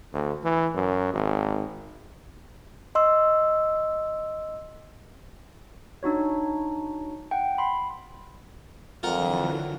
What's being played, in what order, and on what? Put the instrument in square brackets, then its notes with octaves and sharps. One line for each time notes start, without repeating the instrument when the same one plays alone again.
[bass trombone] D2
E3
F#2
G#1
[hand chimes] D#5 C6 E6
[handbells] D4 D#4 F#4 C#5
F#5 G5
B5 C6
[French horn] F2 [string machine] D3 E3 F#3 [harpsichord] F4 A#4 F#5